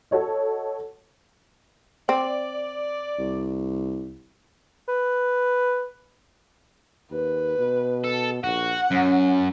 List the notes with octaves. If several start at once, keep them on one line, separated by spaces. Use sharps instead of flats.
F#4 A4 C#5 D#5
C4 D5
C2
B4
D#2 B4
B2
A4
A#1 F#4 F#5
F#2 C#4